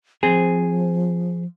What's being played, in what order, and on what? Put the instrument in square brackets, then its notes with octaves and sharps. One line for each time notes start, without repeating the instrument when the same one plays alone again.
[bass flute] F3 [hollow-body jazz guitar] C4 G#4